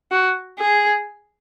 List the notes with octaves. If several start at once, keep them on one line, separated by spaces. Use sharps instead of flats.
F#4
G#4